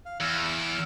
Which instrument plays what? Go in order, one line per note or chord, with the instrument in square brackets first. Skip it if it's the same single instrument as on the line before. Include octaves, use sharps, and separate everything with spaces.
[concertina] F5
[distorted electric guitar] E2 [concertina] E6 F6